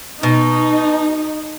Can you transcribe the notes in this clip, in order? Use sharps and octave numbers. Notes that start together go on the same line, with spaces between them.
B2 D#4